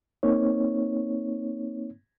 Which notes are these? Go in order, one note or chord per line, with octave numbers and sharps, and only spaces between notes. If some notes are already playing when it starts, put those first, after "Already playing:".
A#3 C4 D#4 C#5